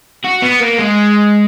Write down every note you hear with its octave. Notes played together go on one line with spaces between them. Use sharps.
F#4
B3
A#3
G#3